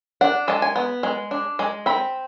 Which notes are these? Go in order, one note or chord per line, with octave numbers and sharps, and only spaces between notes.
D4 F#5
G#3 A5
G#5
B3
G#3
D4
G#3
C4 B5